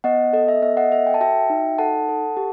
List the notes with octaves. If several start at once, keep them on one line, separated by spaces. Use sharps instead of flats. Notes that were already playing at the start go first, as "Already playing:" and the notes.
B3 D#5 F#5
A4 D#5
E5
B3 E5
D#5 F#5
A4 E5
G5
A5
F#4 E5 G5
D#4
A4 F#5 A5
A4
G4